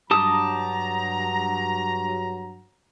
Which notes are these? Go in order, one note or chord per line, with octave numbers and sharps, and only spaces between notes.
G2 F#3 G4 A5 A#5 D#6